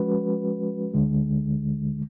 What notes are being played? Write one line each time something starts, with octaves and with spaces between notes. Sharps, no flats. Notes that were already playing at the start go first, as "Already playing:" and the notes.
Already playing: F3 G#3 C#4 F#4 B4
D2 D3 G#3